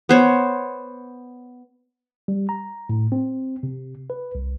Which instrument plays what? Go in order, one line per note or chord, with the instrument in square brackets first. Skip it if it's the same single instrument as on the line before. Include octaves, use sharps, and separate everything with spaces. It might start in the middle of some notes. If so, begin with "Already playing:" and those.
[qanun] B3 C5 C#5
[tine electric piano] G3
A#5
A2
C4
C3
B4
C2